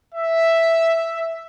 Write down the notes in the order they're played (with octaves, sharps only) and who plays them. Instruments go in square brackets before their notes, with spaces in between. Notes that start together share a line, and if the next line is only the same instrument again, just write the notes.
[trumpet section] E5